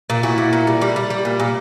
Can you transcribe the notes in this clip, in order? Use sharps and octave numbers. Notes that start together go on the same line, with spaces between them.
A#2
A#2 E4 F#4
A#2
A#2
G3
G3
G3
G3
A#2
A#2